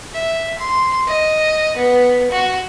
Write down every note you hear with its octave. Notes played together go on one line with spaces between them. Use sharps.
E5
C6
D#5
B3
F#4